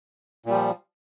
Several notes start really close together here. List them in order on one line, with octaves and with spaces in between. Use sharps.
A#2 G3 F3